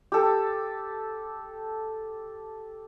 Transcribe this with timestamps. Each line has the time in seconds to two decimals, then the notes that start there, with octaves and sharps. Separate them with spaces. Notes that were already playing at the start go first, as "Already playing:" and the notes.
0.12 G4 A4